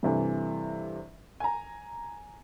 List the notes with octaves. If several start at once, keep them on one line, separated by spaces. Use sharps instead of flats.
G2 C3 E3 A3
G#5 A#5